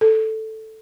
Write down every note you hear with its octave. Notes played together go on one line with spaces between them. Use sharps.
A4